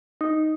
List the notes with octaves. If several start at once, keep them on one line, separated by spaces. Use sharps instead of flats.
D#4